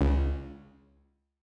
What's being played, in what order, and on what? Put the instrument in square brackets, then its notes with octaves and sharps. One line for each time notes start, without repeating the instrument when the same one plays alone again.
[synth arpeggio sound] C#2